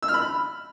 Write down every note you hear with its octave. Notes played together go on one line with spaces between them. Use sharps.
E6
F6
B5